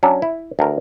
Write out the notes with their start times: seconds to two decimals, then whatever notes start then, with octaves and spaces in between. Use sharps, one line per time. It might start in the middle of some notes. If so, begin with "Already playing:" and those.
0.03 F#3 C#4 D4
0.22 E4
0.59 D2 A#4